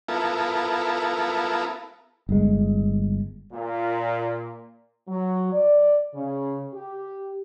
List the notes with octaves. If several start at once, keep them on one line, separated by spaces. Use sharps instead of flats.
B3 E4 F4 A4 A#4
G1 G#3
A#2
F#3
D5
C#3
G4